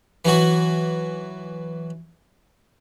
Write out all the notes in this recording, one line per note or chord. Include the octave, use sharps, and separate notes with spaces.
E3 F#3 F#4